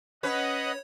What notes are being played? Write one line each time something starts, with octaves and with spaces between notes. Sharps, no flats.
C#4 B4 C#5 D#5 F#5